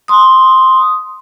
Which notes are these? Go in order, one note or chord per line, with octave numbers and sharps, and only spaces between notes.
C6 D#6